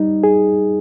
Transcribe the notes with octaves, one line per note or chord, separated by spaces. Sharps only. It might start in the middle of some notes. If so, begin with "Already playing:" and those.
Already playing: G3 D#4
G#4